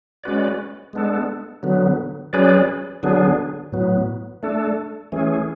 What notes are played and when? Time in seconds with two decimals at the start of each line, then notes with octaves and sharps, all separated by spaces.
0.24 G#3 C#4 F#4 B4 D5
0.93 G#3 B3 D4 A4
1.63 D3 F#3 B3
2.33 F#3 C#4 G#4 B4 D5
3.03 D3 F#3 B3 D4 G#4
3.72 A2 F#3 B3
4.43 A3 D4 A4
5.12 E3 A3 C#4 G#4